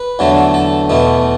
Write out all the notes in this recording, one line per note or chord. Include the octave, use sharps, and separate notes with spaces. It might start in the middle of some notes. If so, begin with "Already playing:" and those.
Already playing: B4
E2 D3 F#3 A3
A4
E2 B2 A3 B3